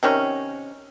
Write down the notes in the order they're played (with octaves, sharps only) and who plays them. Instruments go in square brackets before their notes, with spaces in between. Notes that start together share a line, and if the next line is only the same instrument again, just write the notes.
[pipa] C3 D#3 C#4 C#6